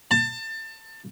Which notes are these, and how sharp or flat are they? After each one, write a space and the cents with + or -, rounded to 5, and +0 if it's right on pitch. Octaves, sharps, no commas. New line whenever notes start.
A5 +25